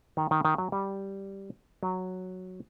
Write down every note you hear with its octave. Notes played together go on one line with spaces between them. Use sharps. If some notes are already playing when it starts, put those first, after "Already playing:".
D#3
D#3
D#3
F#3
G3
F#3